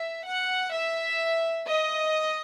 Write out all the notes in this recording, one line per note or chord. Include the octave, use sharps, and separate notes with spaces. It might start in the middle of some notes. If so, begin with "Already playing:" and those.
Already playing: E5
F#5
E5
D#5